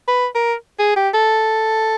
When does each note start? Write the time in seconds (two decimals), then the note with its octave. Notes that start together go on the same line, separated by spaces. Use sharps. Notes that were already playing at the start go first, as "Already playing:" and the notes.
0.08 B4
0.35 A#4
0.79 G#4
0.96 G4
1.14 A4